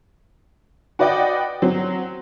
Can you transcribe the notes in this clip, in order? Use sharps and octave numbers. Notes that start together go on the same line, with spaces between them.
F#4 B4 D5 D#5 F#5 G5
F#3 C4